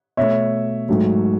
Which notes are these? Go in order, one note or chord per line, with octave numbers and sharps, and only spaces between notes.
B2 A3 C#5 E5
G#2 F#3 A3